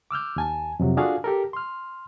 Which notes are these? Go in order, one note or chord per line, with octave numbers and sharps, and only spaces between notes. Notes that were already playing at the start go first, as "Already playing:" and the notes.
D6 E6 F6 G6
D#2 G#5 A5
F2 C3 F#3
D4 F4 F#4 G#4 A4 F5
G4 A4 A#4
C6 F6